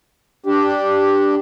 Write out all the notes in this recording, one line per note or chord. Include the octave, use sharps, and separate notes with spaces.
D4 G4